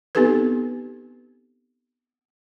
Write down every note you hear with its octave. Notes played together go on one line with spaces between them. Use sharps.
B3 C4 D#4 G4 A4 B4